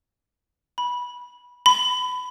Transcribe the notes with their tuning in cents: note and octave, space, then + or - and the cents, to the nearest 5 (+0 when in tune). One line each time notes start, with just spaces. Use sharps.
B5 -15
B5 +20